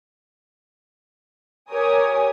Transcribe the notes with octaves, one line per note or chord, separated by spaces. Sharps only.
G4 A#4 C#5 G#5 D#6